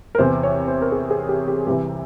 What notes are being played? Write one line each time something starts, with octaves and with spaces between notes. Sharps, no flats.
A#4
E2 C3 E3 C5
C#5
C5
A#4
G#4
G#4
G4
G4
C2 C3 E3 G4